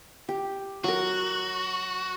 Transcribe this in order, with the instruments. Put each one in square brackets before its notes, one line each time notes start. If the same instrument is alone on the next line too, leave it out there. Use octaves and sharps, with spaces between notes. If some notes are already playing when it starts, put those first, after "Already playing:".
[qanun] G4
[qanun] F#3 A#4 [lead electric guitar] F#4